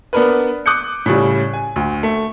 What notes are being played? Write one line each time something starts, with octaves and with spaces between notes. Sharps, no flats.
B3 D4 A#4 B4
D6 D#6 F#6 G6 C#7
A2 C#3 G3
G#5
D2
A3